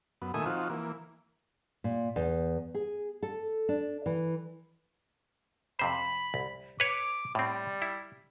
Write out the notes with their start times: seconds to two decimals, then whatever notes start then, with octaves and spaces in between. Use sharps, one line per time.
0.22 F#2 B3
0.34 A#2 D#3 A3 E5 G#5 D#6
0.46 F3 C4 D#4 F4 F#4
0.70 E3 A#3
1.84 A#2
2.16 E2
2.75 G#4
3.23 A4
3.69 D4
4.06 E3
5.79 F2 C3 C5 B5
6.34 C2
6.80 B4 C#5 D6
7.35 A2 G3 C4
7.82 E4